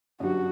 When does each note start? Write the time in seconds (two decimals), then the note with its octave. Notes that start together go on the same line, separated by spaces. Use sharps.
0.20 G1 F#2 D3 G3 D4 F#4